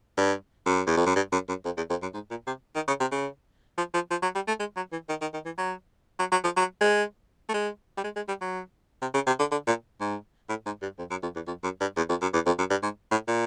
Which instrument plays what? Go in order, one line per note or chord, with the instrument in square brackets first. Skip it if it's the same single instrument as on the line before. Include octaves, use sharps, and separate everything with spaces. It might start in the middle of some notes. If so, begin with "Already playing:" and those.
[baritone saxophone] G2
F#2
E2
F2
F#2
G2
F#2
F#2
F2
E2
F2
F#2
G#2
A#2
C3
D#3
C#3
C3
C#3
F3
F3
F3
F#3
G3
A3
G#3
F#3
E3
D#3
D#3
D#3
E3
F#3
F#3
F#3
F3
F#3
G#3
A3
G#3
G3
G#3
G#3
G3
F#3
C3
C#3
C3
D3
D3
A#2
G#2
A2
G#2
G2
F2
F#2
F2
E2
F2
F#2
G2
E2
F2
F#2
E2
F2
F#2
G2
G#2
A2
A#2